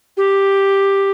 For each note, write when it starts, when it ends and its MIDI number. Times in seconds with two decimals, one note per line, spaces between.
0.17 1.12 67